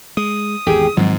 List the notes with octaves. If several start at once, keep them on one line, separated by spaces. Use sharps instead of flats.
G#3 D#6
G#1 E2 G4 G#4 G5
G#2 D#3 F3 F#3 C4